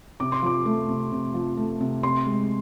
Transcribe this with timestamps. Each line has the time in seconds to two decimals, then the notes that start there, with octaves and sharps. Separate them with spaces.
0.20 C3 D6
0.32 C6
0.43 F3 D6
0.66 A3
0.89 C3
1.12 C3
1.34 F3
1.57 A3
1.81 C3
2.03 C3 C6
2.26 G#3